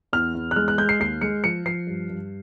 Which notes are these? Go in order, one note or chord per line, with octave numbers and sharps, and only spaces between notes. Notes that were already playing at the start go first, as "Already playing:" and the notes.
E2 F6
E2
F#6
G#3 F6
F#6
G#3 G6
C7
D#2 C7
G#3 C#7
F3 C#7
F3 C7
G2
G2